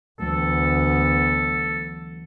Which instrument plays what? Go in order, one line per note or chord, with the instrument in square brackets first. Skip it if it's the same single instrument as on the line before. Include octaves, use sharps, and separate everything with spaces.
[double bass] D2 B3 [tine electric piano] E3 F#3 A3 [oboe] A4